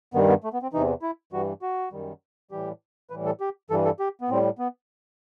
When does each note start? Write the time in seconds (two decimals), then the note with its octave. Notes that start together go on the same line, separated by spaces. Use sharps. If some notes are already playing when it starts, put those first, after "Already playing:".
0.14 G2 D#3 G3 B3
0.29 B3
0.44 A3
0.53 B3
0.63 C4
0.73 E2 C3 E3 D#4
1.02 E4
1.32 G2 E3 G3 F#4
1.62 F#4
1.92 F#2 D#3 G3
2.51 A2 E3 G3 G4
3.10 A2 E3 G3 B4
3.26 A4
3.41 G4
3.70 G2 E3 G3 A4
3.85 A4
4.00 G4
4.21 B3
4.29 A2 G3 C4
4.59 B3